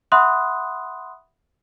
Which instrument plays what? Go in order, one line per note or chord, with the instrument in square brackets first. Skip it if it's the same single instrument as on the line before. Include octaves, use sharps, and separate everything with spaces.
[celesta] E5 F#5 B5 C6 D#6 F#6